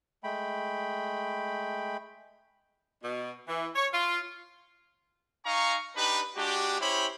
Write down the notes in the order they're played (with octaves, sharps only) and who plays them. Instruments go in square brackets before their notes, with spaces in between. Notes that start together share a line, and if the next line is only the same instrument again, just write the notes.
[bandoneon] G#3 A3 G5 B5
[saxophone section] B2
E3
C#5
F4
[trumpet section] D#4 F5 G#5 A#5 C#6
D4 D#4 G4 B4
G#3 D4 F#4 G4
C#4 E4 G4 C5 C#5 B5